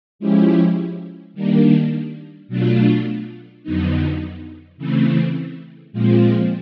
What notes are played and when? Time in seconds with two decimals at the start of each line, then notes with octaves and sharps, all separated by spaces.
0.19 F3 G#3 C#4 E4 G4
1.34 D#3 G3 A#3 D4
2.48 B2 F#3 A3 D4 F4
3.63 F2 D3 F#3 B3 D#4
4.77 C#3 E3 A3 C4
5.92 A#2 F3 G#3 C4 F4